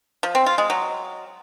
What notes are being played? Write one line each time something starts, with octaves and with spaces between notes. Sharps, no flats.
F3
C4
F4
G#3
F#3